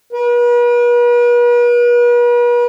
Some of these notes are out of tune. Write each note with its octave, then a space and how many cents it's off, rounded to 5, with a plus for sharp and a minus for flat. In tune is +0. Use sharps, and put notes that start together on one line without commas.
B4 -45